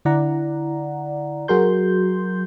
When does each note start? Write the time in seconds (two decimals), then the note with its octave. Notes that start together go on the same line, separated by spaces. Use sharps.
0.05 D3 E4 D5 F#5 A#5
1.48 F#3 F#4 G#4 A#4 C6 G6